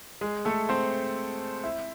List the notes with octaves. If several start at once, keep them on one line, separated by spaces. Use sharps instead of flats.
G#3 G#4
A3 A4
C4 C5
E4 E5